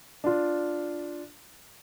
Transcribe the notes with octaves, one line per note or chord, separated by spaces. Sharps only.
D4 F4